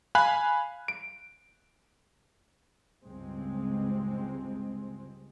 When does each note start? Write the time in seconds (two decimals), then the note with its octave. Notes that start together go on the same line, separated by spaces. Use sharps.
0.15 F5 G#5 B5 F#6
0.88 D7
3.04 C#2 G2 G#3 C4